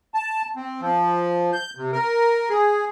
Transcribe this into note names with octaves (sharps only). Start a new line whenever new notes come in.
A5
C4
F3
G6
C3
A#4
G#4